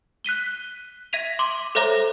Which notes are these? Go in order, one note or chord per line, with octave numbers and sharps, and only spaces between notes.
F#6 B6 D#7 G7
E5 G#6 B6 D#7 F7
C6 D6
A4 C5 C#5 E5 A#5